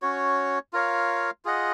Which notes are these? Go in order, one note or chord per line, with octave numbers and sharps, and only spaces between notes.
C#4 F#4 C#5
F4 A#4 C#5 F5
F4 G#4 D#5 F#5